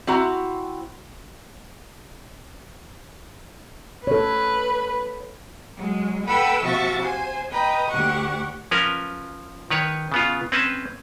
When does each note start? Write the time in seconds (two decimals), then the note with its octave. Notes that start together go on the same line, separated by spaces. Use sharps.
0.07 C4 E4 F#4 A#5
4.07 A4 B4 C#5
5.75 F#3 G#3
6.26 A4 B4 F#5 G5 B5 E6
6.63 C3 F3 F#4 E5 C#6 A6
7.02 C5 G#5
7.50 B4 D#5 G5 A#5
7.88 D2 G4 F#5 C#6
8.71 F3 C#4 A#4 B4
9.70 D#3 B4 C#5
10.12 C#3 B3 F4
10.52 C4 C#4 B4 A5